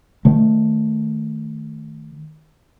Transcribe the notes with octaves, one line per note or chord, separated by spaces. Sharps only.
D#3 A3